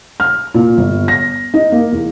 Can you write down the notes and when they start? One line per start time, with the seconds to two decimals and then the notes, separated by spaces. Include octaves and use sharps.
0.20 F6
0.54 A#2
0.78 G1
1.08 A#6
1.54 D#4
1.72 A#3
1.92 E2